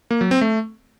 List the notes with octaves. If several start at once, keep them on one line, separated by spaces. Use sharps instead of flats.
A#3
F#3
C4
A3